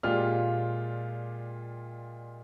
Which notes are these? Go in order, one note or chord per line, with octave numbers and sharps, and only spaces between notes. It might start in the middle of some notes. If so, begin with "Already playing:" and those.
A#2 G#3 F4 G4 D5 F6